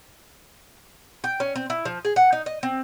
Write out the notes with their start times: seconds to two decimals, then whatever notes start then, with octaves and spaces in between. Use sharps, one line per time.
1.24 G5
1.40 C#4
1.56 C4
1.70 E4
1.85 F3
2.05 G#4
2.16 F#5
2.33 D#4
2.46 D#5
2.63 C4